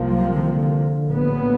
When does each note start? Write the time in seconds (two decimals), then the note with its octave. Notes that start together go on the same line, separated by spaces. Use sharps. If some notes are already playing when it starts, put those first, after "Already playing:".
Already playing: C2 C3 F3 A#3
0.09 F#3
0.33 D3
0.42 D#3
0.52 D3
1.04 A#1 A2 F#3 B3